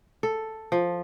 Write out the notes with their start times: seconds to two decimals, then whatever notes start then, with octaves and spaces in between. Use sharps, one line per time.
0.23 A4
0.72 F3